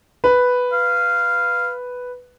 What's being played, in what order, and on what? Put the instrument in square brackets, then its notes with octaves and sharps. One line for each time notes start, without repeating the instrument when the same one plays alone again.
[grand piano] B4
[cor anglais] F5